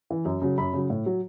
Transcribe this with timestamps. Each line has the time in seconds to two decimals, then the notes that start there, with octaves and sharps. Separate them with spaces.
0.10 E3
0.25 F#2
0.42 C#3 F#3
0.58 F#2 B5
0.73 C#3 F#3
0.90 A2
1.06 F#3